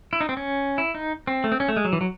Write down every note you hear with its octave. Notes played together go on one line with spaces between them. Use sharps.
E4
D#4
C4
C#4
E4
D#4
C4
A3
C4
C#4
A3
G#3
F#3
E3
F#3